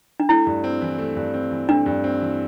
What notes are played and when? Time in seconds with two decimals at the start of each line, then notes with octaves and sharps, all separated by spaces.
0.20 D4
0.29 A3 E4
0.47 G2
0.64 C4
0.82 E3
0.99 A3
1.16 G2
1.34 C4
1.51 E3
1.69 A3 D4
1.86 G2
2.04 C4
2.21 E3